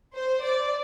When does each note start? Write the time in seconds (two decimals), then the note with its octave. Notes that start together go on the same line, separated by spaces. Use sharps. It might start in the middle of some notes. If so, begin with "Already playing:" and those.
0.16 C5
0.44 D5